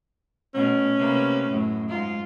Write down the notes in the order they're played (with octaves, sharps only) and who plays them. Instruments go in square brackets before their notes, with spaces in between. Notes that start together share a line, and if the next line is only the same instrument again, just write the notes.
[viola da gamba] B2 A3 [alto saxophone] C#4
[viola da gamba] C3 A#3 B4
F#2 A2
G#2 F4